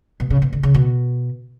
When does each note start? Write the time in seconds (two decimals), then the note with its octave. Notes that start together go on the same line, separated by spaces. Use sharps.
0.20 B2
0.30 C#3
0.42 B2
0.53 D3
0.63 C#3
0.74 B2